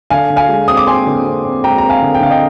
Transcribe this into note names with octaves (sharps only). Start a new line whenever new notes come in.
D3 F5 G#5
D3
F5 G#5
G#3
C4 D#6
D6
C4 G#5 C6
D3
C4
C4
G#3 G5 A#5
C4 A#5
F5 G#5
D3
G5
D3 F5
D#5 G5